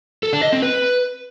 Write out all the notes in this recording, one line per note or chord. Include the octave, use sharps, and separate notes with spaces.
A4
D4
D#5
C4
B4